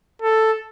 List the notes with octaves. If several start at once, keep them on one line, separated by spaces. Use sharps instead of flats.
A4